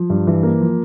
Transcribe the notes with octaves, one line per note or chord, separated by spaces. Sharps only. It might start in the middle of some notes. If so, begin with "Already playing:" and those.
Already playing: F3
G2
E3
A#3
F3